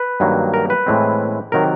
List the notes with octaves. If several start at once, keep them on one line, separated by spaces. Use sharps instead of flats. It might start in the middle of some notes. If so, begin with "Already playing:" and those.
Already playing: B4
G2 D#3 F#3 A#3
A#4
B4
A2 E3 G#3 C4
C3 D#3 F#3 A#4